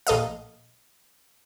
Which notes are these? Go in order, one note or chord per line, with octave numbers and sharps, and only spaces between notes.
A#1 A4 D#5 F5